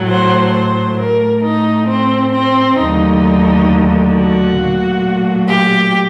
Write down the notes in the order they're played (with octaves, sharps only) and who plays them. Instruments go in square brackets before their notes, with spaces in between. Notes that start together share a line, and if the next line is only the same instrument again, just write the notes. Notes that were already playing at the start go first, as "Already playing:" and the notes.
Already playing: [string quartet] A2 F#3 A3
C5
C5
A2 A3 A#4
D#4
C4
C4
D#2 D3 F#3 A3 D#4
F#4
A#2 F#3 A3
G4